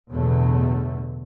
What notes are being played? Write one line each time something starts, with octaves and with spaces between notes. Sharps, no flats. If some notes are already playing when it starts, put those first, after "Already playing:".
A1 E2 B2 D3 F#3 A3